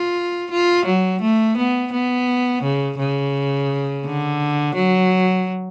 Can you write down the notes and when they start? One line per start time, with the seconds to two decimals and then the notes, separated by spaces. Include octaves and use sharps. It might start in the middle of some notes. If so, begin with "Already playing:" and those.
Already playing: F4
0.51 F4
0.86 F#3
1.22 A3
1.58 B3
1.93 B3
2.63 C#3
2.99 C#3
4.06 D3
4.75 F#3